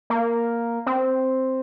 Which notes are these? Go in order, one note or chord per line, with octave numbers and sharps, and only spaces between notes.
A#3
C4